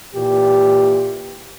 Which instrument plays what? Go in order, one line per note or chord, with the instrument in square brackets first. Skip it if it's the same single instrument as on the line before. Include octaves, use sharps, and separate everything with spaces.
[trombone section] A#2 E3 G4